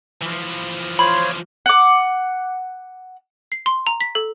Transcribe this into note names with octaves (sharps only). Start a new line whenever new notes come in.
E3 F3
F4 C5 C#5 B5
F#5 D6
C7
C6
A#5
B6
A4